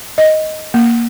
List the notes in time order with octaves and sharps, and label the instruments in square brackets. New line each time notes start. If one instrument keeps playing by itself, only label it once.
[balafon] D#5
A#3